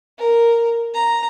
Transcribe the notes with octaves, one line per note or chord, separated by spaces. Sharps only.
A#4
A#5